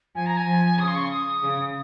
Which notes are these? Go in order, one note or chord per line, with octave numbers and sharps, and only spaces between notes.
F3 G#5
A#5
G#5
F3
C#3 D#6
C6
C#6
C6
D#6
C#3